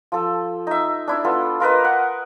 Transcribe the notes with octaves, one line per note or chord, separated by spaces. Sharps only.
F3 A4
D#4 E5
D4 E4 D5
B3 F4 A4
F4 A#4 B4 D#5
F#5